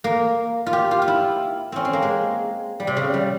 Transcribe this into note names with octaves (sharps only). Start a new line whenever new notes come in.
A#3
F4
G4
F4
F4
E4
C4 C#4
C4
A#3
G#3
G3
C3
C#3
G3